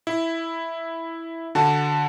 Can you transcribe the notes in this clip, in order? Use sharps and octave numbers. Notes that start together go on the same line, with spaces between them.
E4
D3 F#4 A5